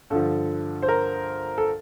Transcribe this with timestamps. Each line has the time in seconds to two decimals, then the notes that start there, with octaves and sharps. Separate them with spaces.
0.10 G2 D3 F3 A4
0.82 C5
0.88 A#4
1.58 A4